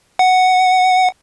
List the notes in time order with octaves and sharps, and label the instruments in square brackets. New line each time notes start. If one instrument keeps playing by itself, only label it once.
[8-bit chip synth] F#5